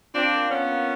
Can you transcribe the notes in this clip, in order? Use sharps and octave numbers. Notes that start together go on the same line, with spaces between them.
C4 D4 F4
A#3
B3 C#4 D4
A#3